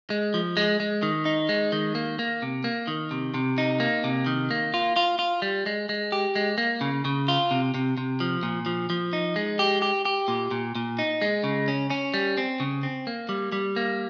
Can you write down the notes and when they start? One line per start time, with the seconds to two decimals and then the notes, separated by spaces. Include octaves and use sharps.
0.10 G#3
0.34 F3
0.57 G#3
0.80 G#3
1.03 D#3
1.25 D#4
1.49 G#3
1.72 D#3
1.95 A#3
2.19 A#3
2.42 C3
2.64 A#3
2.88 D#3
3.11 C3
3.34 C3
3.58 D#4
3.80 A#3
4.04 C3
4.26 D#3
4.51 A#3
4.74 F4
4.96 F4
5.19 F4
5.42 G3
5.66 G#3
5.89 G#3
6.12 G4
6.36 G#3
6.58 A#3
6.81 C#3
7.05 C#3
7.28 F4
7.51 C3
7.74 C3
7.98 C3
8.20 F3
8.43 A#2
8.66 F3
8.90 F3
9.13 D#4
9.36 G#3
9.59 G4
9.82 G4
10.05 G4
10.28 A#2
10.51 A#2
10.75 A#2
10.99 D#4
11.22 G#3
11.44 C#3
11.68 C#4
11.90 C#4
12.14 G3
12.37 C4
12.60 C#3
12.83 C4
13.07 A#3
13.29 G3
13.52 G3
13.76 A#3